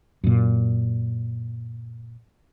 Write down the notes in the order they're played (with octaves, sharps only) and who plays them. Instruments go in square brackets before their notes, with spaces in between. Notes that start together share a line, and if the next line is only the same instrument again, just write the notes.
[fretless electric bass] F#2 A#2